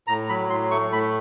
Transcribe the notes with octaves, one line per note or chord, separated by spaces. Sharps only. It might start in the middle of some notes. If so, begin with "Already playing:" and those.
A2 A#5
F#3 B5
A2 C6
A3 C#6
A2 B5